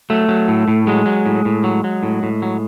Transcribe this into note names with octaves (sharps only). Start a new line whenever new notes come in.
F#3 A3
F#3
A2
A2
F#3 G#3
F#3
A2
A2
F#3
F#3
A2
A2
F#3